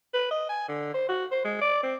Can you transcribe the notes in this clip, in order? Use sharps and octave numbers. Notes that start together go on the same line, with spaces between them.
B4
D#5
G#5
D3
C5
F#4
C5
G#3
D5
C4